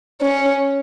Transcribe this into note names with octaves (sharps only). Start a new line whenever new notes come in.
C#4